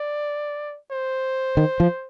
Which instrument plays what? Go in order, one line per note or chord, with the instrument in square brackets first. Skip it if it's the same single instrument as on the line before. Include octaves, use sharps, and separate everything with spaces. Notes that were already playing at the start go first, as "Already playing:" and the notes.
Already playing: [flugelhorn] D5
C5
[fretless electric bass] D#3
F3